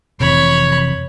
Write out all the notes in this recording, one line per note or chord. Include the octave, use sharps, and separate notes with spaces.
F1 C3 E3 C#5 B5